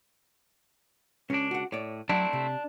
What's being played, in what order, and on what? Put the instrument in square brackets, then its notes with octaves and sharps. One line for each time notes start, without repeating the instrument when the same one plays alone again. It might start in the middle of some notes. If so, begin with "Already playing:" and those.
[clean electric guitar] C#2 D4 [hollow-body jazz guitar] C#4
[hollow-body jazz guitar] F#4 F#5
[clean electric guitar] A2 [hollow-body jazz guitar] C#5 D5
[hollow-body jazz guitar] F#3 [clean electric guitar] A3 C4 E4 [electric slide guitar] D4
[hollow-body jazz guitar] C3